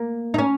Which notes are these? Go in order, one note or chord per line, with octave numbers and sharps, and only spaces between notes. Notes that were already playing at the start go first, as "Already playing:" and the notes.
Already playing: A#3
D#4
C#4